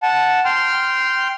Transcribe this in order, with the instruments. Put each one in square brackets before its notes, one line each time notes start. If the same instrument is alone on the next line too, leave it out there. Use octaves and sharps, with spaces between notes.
[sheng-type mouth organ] F#5 A5
G5 C6 F6